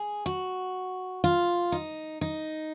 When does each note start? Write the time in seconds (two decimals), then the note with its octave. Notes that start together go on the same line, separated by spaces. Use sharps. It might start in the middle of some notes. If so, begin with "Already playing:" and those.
Already playing: G#4
0.26 F#4
1.24 F4
1.72 D#4
2.21 D#4